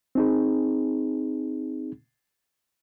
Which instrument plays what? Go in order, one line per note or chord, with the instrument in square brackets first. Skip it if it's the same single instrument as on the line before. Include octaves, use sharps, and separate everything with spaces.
[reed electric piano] C4 D#4 G#4